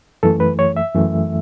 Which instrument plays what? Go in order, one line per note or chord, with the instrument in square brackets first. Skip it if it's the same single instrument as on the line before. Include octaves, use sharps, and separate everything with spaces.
[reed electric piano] F#2 E3 A3 A4
B4
C#5
E5
F#2 E3 A3